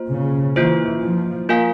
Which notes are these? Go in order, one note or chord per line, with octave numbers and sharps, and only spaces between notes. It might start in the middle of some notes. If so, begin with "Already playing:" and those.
Already playing: A#3 F4 C5
C#3
E3 A#3 F4 C5
F3
A#3 F4 A#4 F5 G#5